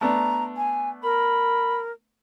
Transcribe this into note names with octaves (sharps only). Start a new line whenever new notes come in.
A3 B3 D4 A#5
G#5
A#4 B5